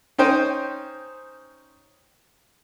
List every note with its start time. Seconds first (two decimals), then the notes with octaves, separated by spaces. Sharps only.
0.18 C#4 D#4 C5 G5